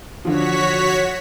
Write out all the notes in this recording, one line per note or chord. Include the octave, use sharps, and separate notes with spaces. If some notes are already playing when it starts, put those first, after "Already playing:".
D3 F3 F#4 C#5 B6